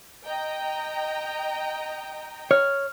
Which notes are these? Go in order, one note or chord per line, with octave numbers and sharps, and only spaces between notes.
D#5 G5 A#5
C#5 F6